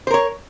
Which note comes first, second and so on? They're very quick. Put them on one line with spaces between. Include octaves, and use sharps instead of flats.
C5 A#4 C#5